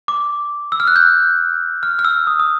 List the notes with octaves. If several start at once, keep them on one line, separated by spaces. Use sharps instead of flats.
D6
E6
F6
F#6
G6
F6
F6
E6
D#6
D#6